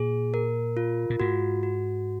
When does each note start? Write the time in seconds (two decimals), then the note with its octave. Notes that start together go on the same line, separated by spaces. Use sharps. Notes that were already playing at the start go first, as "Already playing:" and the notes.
Already playing: A#2 G#4
0.34 A#4
0.77 F4
1.10 A#2
1.20 G#2 F#4
1.63 F#4